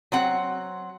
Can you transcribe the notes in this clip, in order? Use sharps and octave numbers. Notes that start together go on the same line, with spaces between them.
F#3 C4 F#5